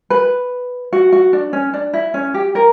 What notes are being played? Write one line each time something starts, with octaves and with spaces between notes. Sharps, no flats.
B4
F#4
F#4
D4
C#4
D4
E4
C#4
G4
A#4